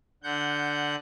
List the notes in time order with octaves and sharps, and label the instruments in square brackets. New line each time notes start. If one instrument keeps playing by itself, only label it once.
[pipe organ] D3 F#5 G6